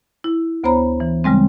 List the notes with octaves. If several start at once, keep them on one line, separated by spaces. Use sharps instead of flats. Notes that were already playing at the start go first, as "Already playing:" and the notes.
E4
D2 B3 C5 C#5 A#5 B5
E3
C#3 G3 G#3 C4